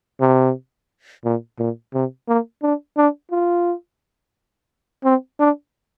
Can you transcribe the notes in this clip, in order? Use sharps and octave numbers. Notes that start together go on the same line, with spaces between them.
C3
A#2
A#2
C3
A#3
D4
D4
F4
C4
D4